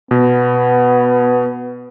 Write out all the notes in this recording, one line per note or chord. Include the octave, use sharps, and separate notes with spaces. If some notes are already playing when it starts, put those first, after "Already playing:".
B2 B3